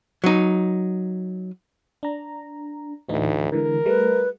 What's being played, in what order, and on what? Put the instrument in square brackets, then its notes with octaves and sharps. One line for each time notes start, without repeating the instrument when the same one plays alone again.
[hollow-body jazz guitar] F#3 D#4
[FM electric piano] D4 A#5
[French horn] D2 [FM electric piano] A2 E3 D#4
[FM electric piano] D3 E3 G#3 [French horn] A#4
[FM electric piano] G3 A3 [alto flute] B4